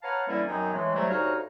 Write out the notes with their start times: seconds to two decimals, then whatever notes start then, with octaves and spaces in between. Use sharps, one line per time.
0.03 B4 C#5 F5 F#5 A5 A#5
0.27 D3 E3 G3 A#3 C#4 E4
0.48 F#2 D#3 F#3 B3 C4 D#4
0.73 A2 E3 G#3
0.94 A2 C3 F#3 G3 A3
1.09 D2 C3 D#4 F#4 C#5 F5